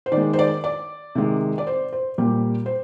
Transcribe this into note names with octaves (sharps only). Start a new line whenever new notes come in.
C5
D#3 D5
G#3
C5
D5
D5
C3 D#3 G#3
D5
C5
C5
A#2 G3 A#3 G4
C5